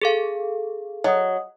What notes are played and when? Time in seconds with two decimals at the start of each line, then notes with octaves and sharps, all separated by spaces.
0.02 G#4 A4 F5
1.04 F#3 D#5 F#5 D#6